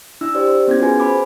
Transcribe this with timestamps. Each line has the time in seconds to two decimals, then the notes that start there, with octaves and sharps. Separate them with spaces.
0.21 D4 E4 E6
0.35 G4 C5 D5
0.47 C5
0.68 B3 C#4 E4 G#6
0.80 F4 F#4 G#4 B4 G#5
1.00 C5 B5 D6